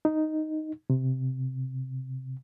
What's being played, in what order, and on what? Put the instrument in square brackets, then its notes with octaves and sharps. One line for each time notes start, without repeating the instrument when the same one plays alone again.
[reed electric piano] D#4
C3